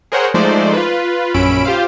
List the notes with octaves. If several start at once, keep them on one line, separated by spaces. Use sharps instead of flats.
G#4 A#4 C5 C#5 F#5 G5
F3 G#3 A3 D#4 C5 D5
F4 B4
A#1 F#2 C#4 B5 E6 D7
F4 G4 C5 F5